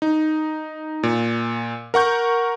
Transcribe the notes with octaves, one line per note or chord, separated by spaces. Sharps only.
D#4
A#2
A#4 F#5 C#6 G6